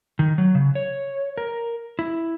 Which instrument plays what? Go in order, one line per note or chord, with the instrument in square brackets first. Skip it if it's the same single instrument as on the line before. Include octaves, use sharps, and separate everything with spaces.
[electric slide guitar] D#3
F#3
C#3
C#5
A#4
E4